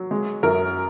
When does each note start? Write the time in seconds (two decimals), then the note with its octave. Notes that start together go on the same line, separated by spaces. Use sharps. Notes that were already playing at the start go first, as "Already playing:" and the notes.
Already playing: F#3
0.11 G#3
0.43 F#2 A#4